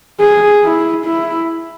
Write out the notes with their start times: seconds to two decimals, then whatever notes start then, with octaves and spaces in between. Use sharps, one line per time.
0.20 G#4
0.64 E4
1.06 E4